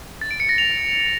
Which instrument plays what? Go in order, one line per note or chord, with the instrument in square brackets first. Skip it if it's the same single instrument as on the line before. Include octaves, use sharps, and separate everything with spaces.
[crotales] A6
D7
C#7
A#6
F7